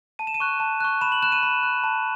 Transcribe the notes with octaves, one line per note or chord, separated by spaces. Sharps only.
A5 D#7
E7
D#7
C#6 F#6
A5
C#6 F#6
B5 E7
F#7
F#6 E7
D#7
B5
F#6
A5